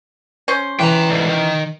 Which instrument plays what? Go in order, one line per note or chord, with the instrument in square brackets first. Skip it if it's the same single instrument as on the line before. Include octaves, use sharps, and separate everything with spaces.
[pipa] C#4 C5
[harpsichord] E3 B4 [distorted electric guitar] G5 A#5
[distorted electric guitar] D2 G#2
D#3